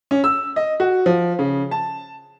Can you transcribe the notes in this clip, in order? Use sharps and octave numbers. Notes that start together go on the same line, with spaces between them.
C#4
E6
D#5
F#4
F3
C#3
A5